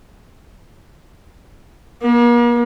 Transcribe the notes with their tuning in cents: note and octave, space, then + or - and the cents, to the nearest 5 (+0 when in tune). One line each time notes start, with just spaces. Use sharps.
A#3 +40